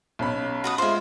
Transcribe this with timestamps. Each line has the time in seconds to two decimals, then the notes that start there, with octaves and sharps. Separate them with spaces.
0.19 B1 C#4 B5
0.64 F#4 B4 D#6
0.78 G#3 F4 C5 E5